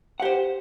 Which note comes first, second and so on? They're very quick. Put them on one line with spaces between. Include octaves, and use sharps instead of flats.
F#5 G4 C5